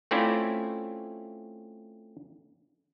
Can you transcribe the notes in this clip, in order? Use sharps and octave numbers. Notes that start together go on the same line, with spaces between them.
A3 C4 C#4 E4 F4 D5